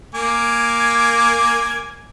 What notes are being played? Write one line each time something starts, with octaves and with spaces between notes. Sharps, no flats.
A#3 G#5 D6